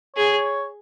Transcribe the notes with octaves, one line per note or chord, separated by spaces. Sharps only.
G#4 C#5